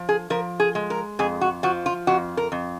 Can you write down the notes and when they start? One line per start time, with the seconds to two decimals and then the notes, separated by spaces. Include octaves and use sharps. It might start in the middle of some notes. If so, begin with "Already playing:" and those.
Already playing: F3
0.09 G#4
0.30 F3 A#4
0.60 G#4
0.75 G#3
0.90 A#4
1.19 F2 G#4
1.41 F#4
1.63 F3 F#4
1.86 F4
2.07 F2 F#4
2.37 A#4
2.52 F2